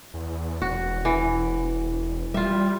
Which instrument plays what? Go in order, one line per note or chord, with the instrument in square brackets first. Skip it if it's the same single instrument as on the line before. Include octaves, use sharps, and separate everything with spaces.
[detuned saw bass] E2
[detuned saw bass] E1 [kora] F#4
[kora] E3
[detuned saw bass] G3 [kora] F4 E5